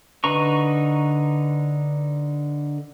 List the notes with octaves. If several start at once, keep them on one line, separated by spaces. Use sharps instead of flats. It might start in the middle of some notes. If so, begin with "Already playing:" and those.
D3 D#4 B4 A#5 C#6